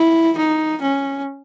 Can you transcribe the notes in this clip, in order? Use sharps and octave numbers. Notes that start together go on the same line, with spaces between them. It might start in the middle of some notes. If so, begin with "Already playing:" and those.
Already playing: E4
D#4
C#4